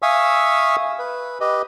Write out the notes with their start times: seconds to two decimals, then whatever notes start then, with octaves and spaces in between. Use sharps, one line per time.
0.02 E5 F5 G#5 C#6 D#6 E6
0.99 B4
1.41 G4 B4 D#5